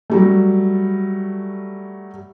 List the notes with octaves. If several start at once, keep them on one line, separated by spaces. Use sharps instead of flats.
F#3 G3 A3